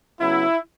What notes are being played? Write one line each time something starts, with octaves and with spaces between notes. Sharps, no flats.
C#3 F#3 B3 E4